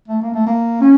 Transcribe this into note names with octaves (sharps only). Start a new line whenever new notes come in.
A3
A#3
A3
A#3
C#4